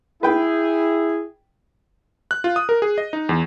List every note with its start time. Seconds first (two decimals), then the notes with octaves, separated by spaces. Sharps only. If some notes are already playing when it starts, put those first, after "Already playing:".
0.23 E4 G#4 B4 G5
2.31 F#6
2.44 F4
2.56 D#6
2.69 A#4
2.82 G#4
2.98 D#5
3.13 D#4
3.29 E2